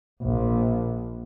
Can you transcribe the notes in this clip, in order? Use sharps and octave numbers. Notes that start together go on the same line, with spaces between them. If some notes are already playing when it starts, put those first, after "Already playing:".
A#1